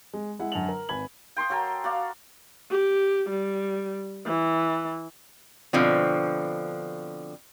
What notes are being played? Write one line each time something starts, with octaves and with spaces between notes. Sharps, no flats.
G#3
G#3 E4 F#5
F#2 D3 F#5 A5 F7 F#7
A#4
G#1 B4 G#5 B5 G#6 F#7
G5 C6 C#6 D#6
F#3 A4 A#4 G5
F#4 D5 F5
G4
G3
E3
B2 D3 F3 C4